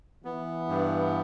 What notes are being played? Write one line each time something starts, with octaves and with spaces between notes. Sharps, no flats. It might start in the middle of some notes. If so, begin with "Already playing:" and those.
E3 B3
G2